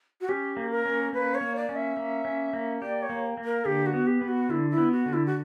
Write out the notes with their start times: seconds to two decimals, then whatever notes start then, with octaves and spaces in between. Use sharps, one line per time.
0.21 F#4
0.29 C#4 G4
0.57 A#3
0.71 A#4
0.86 C#4
1.13 A#3 B4
1.34 C#5
1.41 A#3
1.56 D5
1.69 C#4
1.76 E5
1.97 A#3
2.25 C#4
2.53 A#3
2.82 G4 D5
3.02 C#5
3.10 A#3
3.37 A#3
3.45 A#4
3.65 D3 G4
3.86 F#4
3.93 B3
4.07 G4
4.21 B3
4.28 F#4
4.49 D3 E4
4.70 E4
4.78 B3
4.92 F#4
5.06 D3
5.13 E4
5.26 F#4